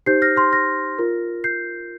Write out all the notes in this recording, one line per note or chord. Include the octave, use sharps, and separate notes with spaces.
D#4 G4 C5 G6 C7
F6 A#6
C6 F6
F6 A#6
F4 A#4
G6 C7